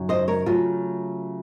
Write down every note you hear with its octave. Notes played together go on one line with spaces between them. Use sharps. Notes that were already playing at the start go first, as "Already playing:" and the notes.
Already playing: F#2 C#3 F#3 D#4
C5 D#5
A#4 C#5
C#3 F#3 A3 F4